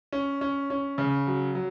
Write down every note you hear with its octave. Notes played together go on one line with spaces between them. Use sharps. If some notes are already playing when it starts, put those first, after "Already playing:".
C#4
C#4
C#4
C#3
F#3
F#3